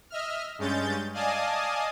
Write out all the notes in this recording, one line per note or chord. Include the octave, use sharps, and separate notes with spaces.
D#5 E5 F6
G2 G#3 C#4 G6 A6
D5 D#5 F5 G#5 A5 D#6